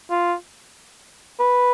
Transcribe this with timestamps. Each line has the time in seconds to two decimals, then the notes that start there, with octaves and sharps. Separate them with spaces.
0.10 F4
1.40 B4